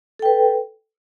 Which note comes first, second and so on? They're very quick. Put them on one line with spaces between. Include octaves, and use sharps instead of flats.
A4 G5 B4